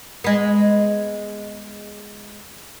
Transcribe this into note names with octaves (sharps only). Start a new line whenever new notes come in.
G#3 B3